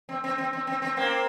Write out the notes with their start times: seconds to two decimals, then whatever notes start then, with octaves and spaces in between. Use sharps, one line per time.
0.09 C4
0.24 C4
0.38 C4
0.53 C4
0.67 C4
0.82 C4
0.97 A#3 C4